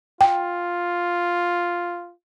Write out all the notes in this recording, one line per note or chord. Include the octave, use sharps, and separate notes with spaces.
F4 G5